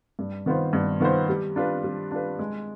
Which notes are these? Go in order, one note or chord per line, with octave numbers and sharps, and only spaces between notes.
G2
D#3 B3 F4 C5
G2
D#3 B3 F4 C5
G3
D4 F4 B4
G3
D4 F4 B4
G#3